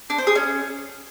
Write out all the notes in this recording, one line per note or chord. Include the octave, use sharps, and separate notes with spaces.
D4
C5
G#4
C#4